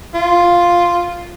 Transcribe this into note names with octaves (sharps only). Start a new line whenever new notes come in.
F4